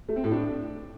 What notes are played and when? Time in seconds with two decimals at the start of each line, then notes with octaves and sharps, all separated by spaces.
0.09 A3
0.16 C4
0.24 A2
0.31 D4